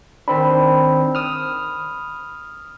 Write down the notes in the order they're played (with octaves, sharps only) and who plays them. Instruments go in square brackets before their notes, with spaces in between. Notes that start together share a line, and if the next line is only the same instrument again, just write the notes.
[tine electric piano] D#3 C4 D4 [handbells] B5
[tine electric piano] D#6 F6